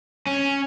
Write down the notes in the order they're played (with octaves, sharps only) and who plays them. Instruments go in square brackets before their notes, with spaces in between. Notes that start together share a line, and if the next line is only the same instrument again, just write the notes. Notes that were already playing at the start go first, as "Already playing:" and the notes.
[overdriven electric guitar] C#4